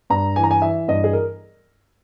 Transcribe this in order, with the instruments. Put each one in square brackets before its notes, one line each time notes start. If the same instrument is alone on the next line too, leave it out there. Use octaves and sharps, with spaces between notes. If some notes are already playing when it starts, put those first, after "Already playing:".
[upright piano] G2 A#5
E3 G#5
A#5
G#5
E3 E5
G2 D#5
G#4
A#4